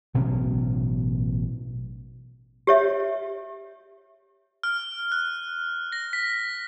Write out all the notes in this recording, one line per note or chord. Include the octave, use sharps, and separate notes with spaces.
A1 B2 F#3 C#4
G4 C#5 E5
F6
F#6
A#6
B6